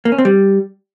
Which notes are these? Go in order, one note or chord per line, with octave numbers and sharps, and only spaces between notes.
A#3
C#4
C4
G3